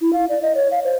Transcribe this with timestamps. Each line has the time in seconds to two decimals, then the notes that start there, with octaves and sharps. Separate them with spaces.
0.01 E4
0.13 F5
0.29 D5
0.42 D#5
0.55 C#5
0.71 F5
0.84 C5